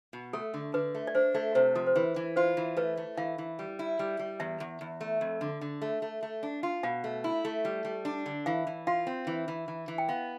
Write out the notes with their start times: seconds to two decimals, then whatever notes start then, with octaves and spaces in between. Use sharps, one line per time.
0.13 B2
0.33 A3 A4
0.54 D3
0.74 D3 B4
0.95 A3
1.07 D5
1.15 D4 C5
1.34 A3 D5
1.55 C3 C5
1.75 F3 A4
1.87 C5
1.96 E3 B4
2.16 E3
2.36 F4 C5
2.57 E3
2.77 A3 B4
2.97 A3
3.17 E3 F5
3.38 E3
3.59 G3
3.79 E4
3.99 G3
4.19 G3
4.40 E2 E5
4.60 E2
4.81 E2
5.01 A3
5.21 F2
5.41 D3
5.61 D3
5.82 A3
6.02 A3
6.23 A3
6.43 D4
6.63 F4
6.83 B2 F5
7.04 A3
7.24 E4
7.45 A3
7.65 G3
7.85 G3
8.05 D4
8.26 D3
8.46 E3 F5
8.67 E3
8.87 F4 F5
9.07 C4
9.27 E3
9.48 E3
9.68 E3
9.88 E3
9.98 G5
10.08 B3 F5